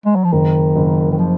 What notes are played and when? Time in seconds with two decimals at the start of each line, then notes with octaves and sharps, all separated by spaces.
0.06 G#3
0.16 F#3
0.24 F3
0.33 F#1 D#3
0.75 F#1
1.12 D#3
1.19 F3